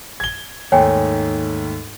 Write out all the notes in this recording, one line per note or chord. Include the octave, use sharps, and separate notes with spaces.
G#6 G7
D#2 G#2 A3 C#5 G5 G#5